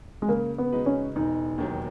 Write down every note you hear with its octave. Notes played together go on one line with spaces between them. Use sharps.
G#3
C#3 A#3
B3
G#3 D#4 F#4 B4
C#4
E1 D#4
D#2 D#3 F#3